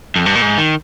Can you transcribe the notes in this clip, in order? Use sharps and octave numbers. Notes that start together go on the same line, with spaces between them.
F2
G2
A#2
G#2
D#3